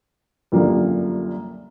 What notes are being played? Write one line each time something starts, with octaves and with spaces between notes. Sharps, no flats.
C2 F#2 D3 F3 G3 A#3